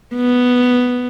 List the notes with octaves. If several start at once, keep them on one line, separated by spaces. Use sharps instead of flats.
B3